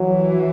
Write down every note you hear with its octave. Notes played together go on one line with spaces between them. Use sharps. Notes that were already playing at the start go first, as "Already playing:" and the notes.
Already playing: E3 F#3